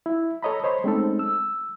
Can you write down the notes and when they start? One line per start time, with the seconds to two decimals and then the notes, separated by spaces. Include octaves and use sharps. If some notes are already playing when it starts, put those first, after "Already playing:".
0.06 E4
0.43 A4 C#5 D#5 A#5 B5
0.64 C5 C#5 D#5 B5 C6
0.84 G#3 A3 C4 C#4 D#4 A4
1.19 E6